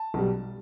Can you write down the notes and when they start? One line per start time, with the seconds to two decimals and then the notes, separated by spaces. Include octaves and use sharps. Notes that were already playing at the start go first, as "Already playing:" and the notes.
Already playing: A5
0.14 B1 B2 G3